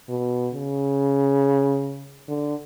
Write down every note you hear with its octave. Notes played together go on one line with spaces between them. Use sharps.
B2
C#3
D3